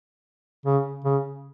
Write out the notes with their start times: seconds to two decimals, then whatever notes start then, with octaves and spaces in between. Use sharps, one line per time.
0.66 C#3
1.04 C#3